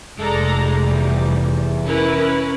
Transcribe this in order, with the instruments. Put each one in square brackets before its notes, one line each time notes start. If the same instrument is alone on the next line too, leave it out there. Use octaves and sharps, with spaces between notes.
[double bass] F1 [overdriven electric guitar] G#3 [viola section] A4 D5 A#5
[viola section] G3
[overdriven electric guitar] E2
[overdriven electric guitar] C#4 [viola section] E4 A#4 B4